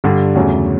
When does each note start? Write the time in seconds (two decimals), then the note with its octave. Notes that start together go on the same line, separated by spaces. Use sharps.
0.04 G2 D3 G3 D4
0.35 E2 C#3 F#3 A3 C#4